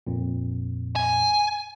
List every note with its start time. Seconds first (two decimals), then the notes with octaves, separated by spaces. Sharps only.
0.07 A#1 F2 A#2
0.96 G#5